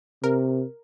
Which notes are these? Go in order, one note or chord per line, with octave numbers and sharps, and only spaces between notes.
C3 A#4